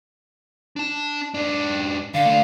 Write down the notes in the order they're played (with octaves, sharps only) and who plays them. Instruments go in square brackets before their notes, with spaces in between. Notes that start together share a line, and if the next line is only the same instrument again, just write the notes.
[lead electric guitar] D4 A5
G#2 D4
[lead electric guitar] D3 [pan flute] F5
[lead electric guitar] A3 D4